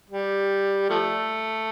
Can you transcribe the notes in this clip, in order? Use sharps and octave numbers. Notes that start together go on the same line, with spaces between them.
G3
F3 A3